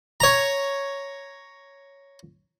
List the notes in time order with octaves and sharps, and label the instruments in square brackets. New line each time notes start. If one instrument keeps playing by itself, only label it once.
[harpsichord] C#5 A#5